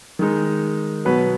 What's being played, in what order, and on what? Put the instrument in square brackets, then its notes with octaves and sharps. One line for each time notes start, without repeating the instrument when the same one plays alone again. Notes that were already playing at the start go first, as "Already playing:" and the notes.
[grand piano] D#3 G#3 D#4
B2 F#3 B3 B4